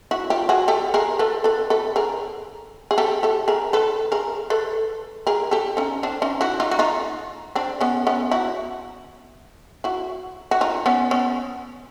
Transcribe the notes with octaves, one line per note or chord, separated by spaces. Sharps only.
E4 F#4
F4 G4
F#4 G#4
G4 A4
G#4 A#4
A4 B4
A4 B4
A4 B4
G#4 A#4
G#4
G4 A4
G4 A4
G#4 A#4
A4 B4
G#4 A#4
A4 B4
G#4 A#4
G4 A4
C#4 D#4
C4 D4
C#4 D#4
E4 F#4
D#4 F4
F#4
D#4 F4
C4 D4
B3 C#4
B3 C#4
E4 F#4
E4 F#4
F#4
D#4 F4
B3 C#4
B3 C#4